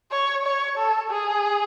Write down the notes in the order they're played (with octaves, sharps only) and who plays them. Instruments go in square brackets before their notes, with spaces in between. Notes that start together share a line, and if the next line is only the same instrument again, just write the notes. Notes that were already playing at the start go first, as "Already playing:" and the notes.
[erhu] C#5
C#5
A4
G#4